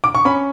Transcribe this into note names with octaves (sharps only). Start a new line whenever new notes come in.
D6
C#6
C#4 B5